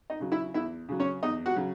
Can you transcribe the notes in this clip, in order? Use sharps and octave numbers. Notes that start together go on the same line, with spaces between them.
D#4 D#5
C#3 F#3
E4 E5
E2 E4 E5
C#3 F#3
C#4 C#5
E2 D#4 D#5
F#4 F#5
C#3 F#3